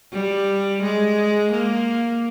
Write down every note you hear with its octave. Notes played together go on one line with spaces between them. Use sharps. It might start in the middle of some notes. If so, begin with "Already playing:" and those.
G3
G#3
A#3